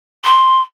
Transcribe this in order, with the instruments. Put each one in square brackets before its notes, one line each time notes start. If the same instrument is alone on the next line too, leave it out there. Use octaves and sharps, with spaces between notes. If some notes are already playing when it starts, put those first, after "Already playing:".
[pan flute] C6